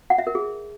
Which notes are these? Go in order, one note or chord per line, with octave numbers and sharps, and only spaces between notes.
F#5
E5
A#4
G#4